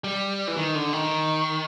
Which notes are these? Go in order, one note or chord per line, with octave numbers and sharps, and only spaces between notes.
G3
E3
D#3
D3
D#3